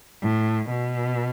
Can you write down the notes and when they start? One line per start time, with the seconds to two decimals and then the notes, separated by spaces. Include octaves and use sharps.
0.23 A2
0.71 B2